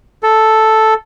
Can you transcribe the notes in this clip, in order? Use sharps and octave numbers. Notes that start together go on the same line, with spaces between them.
A4